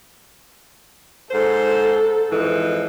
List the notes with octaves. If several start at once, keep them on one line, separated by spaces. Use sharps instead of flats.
G#2 A4 C5
F2 G#2 E3